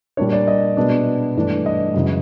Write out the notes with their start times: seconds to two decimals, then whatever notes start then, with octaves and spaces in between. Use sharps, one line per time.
0.17 A#2 G3 A#3 D4 C#5
0.32 D5
0.47 D#5
0.77 B2 G#3 B3 D4
1.36 G2 E3 A3 D4
1.66 D#5
1.94 F#2 C#3 E3 G#3